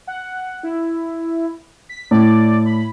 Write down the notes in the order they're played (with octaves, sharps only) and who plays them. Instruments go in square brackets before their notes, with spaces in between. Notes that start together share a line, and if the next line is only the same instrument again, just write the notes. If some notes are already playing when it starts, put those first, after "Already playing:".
[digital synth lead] F#5
E4
B6
[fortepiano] A2 [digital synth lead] D5
[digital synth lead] B5